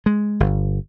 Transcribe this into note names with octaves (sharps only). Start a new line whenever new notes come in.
G#3
G1